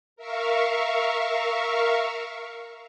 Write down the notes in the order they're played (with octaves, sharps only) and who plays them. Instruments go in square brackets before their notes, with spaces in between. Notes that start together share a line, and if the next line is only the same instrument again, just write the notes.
[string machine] A#4 E5 F5 C#6